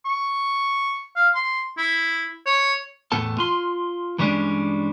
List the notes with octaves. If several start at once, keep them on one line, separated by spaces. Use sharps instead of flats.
C#6
F5
C6
E4
C#5
E2 A2 B3 A4 A5
F4 C6
G2 E3 G3 G#3 C#4 D4